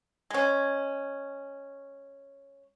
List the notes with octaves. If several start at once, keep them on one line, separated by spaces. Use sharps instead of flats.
G#3 C#4